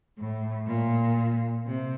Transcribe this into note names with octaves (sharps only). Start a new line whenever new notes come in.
A2
A#2
C3